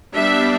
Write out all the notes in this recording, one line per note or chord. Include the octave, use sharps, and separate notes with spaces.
G3 B3 D4 E5